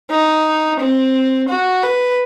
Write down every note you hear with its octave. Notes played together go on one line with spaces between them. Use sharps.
D#4
C4
F#4
B4